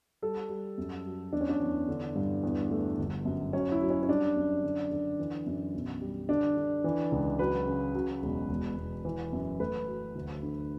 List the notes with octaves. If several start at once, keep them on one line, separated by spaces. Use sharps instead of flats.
G3 A4
G3
F#2
F#3
E2 D4
C#4
D4
E2
D3
G2
E2
A3
G1
F#2
F#3 C#4
E4
F#3
C#4
C#4
G3 D4
F#2
D3
D3
E3
F#2
B1
G3
D3 D4
D3
E3
C#2
F#3 B4
C#3
F#3
E1
E1
E1
E3
F#2
A3 B4
F#3
D2
D3